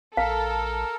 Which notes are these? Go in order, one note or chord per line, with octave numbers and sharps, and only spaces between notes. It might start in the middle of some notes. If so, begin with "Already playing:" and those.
A#1 A4 A#4 F5